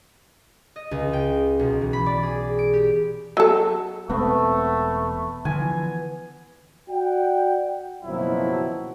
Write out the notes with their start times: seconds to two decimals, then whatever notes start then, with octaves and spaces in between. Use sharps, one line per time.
0.76 D#5
0.91 C#2
1.13 G5
1.59 B1
1.82 E3
1.93 B5
2.06 D5
2.23 G#4
2.59 D7
2.73 G4
3.37 F#3 A4
4.10 E1 G#3 A3 B3 C4
5.45 D3 E3 F3 G#5
6.89 F#4 D5 F#5 G5
8.03 F#1 B2 D#3 F3 F#3 E4